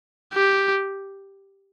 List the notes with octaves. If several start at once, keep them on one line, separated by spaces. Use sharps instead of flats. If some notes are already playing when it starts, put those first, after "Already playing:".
G4